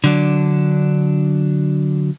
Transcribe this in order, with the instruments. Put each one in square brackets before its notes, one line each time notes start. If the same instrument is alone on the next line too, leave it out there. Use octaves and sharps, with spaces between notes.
[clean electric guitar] D3 F#3 D4